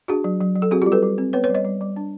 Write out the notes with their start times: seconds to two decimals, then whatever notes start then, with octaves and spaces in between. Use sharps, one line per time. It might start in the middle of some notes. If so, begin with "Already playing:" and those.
0.08 D4 F#4 G#4
0.24 F#3
0.41 F#3
0.55 F#3
0.62 A4
0.71 C4 F#4 G#4
0.82 F4 G4
0.86 G3
0.92 A4 B4
1.03 G3
1.18 C4
1.33 B3 B4 C#5
1.44 B4 C#5
1.49 G3
1.55 C#5 D#5
1.65 G3
1.81 G3
1.96 D4